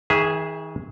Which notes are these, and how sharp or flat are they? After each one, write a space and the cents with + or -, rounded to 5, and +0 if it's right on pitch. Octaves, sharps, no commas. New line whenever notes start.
D#3 +45 G#4 +0 E5 +0